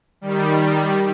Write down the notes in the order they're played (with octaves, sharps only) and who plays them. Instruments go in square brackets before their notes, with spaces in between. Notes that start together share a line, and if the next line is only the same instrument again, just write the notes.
[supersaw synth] D#3 G3